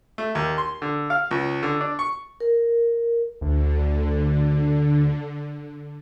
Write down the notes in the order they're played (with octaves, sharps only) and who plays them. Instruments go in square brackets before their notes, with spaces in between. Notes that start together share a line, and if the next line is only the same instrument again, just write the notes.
[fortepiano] A3
D#2
C6
D3
F5
C#2
D3
D4
C#6
[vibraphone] A#4
[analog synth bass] D2 [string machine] D3